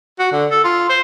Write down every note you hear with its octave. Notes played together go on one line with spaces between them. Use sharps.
F#4
D3
A4
F4
C5